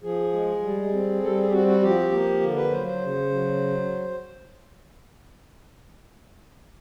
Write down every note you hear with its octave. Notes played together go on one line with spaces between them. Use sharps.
F3 G#4
G#3
G3
C4
G3 A4
G#4
G4
C4 F#4
F#4
F3 G4
A#3
D3
B4
F#3 C5
C5
C#3
F#3